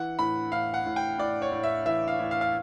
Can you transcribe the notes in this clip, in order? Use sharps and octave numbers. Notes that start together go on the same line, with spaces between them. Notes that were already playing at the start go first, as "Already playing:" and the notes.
Already playing: E3 F#5
A2 B5
A2 F5
F#5
A2
G5
A2 D5
C#5
A2
E5
E3 E5
F5
A2
F5
F5